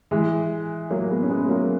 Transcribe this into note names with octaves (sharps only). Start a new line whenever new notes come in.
E3 G#3
F#3 A#3
G#3 B3
C#4
G#3 B3
G#3
F#3 A#3